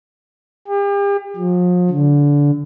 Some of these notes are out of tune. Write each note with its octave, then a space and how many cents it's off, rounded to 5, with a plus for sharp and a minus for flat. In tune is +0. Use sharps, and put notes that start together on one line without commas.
G4 +40
F3 +40
D3 -25